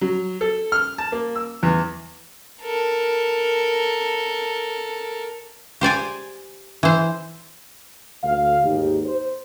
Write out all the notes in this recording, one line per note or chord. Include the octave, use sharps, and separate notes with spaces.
F#3
A4
F6
A5
A#3
E6
E2
A4 A#4
G4 C5 D5 G#5
E3 C5
D2 F5
G#1 D#2 D#4 G4
C5